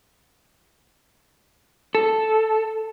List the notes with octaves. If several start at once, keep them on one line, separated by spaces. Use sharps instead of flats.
A4